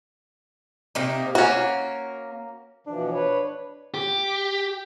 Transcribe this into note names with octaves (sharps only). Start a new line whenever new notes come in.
C3 A#3 D#4
A#3 C#4 F#4
B2 E3 F3 D4
B4 C#5
G4